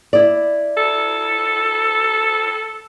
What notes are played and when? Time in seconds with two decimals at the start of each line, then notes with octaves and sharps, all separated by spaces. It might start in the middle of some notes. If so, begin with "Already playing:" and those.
0.13 E4 D5
0.77 A4